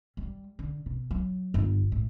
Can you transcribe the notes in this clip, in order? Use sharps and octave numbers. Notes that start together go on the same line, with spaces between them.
G3
D3
B2
F#3
G1
A2